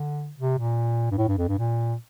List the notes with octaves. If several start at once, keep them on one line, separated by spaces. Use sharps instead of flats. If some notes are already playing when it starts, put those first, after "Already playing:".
Already playing: D3
C3
A#2
G2
A2
G2
F2
G2
A#2